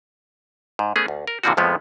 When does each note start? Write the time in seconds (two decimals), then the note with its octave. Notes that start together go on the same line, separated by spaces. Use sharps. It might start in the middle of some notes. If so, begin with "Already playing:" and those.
0.79 G#2
0.96 A3 B3 C#4 G#4
1.08 D2
1.27 A#4
1.43 A#2 D3 E3 F3 C4 F#4
1.57 F2 A2 F3 G#3 A3 B3